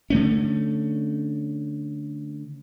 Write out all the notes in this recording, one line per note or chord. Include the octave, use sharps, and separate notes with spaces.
D3 A3 C#4